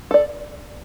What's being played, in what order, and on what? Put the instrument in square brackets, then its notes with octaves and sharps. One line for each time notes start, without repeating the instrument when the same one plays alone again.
[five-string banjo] A4 D5